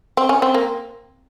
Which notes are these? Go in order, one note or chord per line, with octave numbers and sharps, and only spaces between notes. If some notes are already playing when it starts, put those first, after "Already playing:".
C4
C#4
C4
A#3